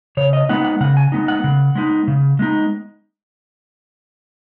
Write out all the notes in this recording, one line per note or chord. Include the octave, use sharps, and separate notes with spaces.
C#3 C#5
D#5
G#3 B3 D#4 F#5
F#5
C#3 F#5
G#5
G#3 B3 D#4
F#5
C#3
G#3 B3 D#4
C#3
G#3 B3 D#4